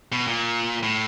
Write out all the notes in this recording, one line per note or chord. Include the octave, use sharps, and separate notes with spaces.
B2
A#2
A2